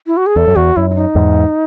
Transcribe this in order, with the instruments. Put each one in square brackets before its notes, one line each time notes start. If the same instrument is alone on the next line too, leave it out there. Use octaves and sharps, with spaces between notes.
[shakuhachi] E4
F#4
G#4
[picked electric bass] E2 [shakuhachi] A4
[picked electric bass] F#2
[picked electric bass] E2 [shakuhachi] F#4
[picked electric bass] F#2 [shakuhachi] E4
[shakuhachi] E4
D#4
[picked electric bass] E2 G#2